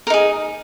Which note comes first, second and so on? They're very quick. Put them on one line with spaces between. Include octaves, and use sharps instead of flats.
A#4 D#4 G#4